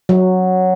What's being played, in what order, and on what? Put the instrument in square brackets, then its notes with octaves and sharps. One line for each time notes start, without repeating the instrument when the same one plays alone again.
[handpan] F#3